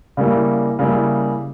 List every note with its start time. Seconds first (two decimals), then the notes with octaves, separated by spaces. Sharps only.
0.17 C#3 G3 A#3 E4
0.79 C#3 G3 A#3 E4